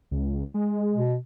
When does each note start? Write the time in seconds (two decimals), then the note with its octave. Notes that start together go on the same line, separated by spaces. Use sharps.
0.11 C#2
0.54 G#3
0.94 B2